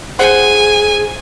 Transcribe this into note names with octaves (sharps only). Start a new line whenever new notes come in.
G#4 C5 F#5 G#5 C6